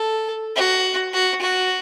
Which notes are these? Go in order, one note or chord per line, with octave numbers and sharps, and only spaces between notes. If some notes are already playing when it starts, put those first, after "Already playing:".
Already playing: A4
F#4
F#4
F#4